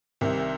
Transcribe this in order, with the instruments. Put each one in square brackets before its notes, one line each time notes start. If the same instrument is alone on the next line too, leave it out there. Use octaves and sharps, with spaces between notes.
[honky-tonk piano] C2 C3 D#3